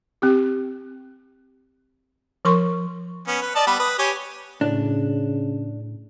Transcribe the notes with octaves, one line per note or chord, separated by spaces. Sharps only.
C4 G4
F3 A#4 C6 C#6
B3 C#4
B4
D5 D#5 A5
G3 B3 B4
B4 D#6
G4 C#5 G#5
A2 C#3 D4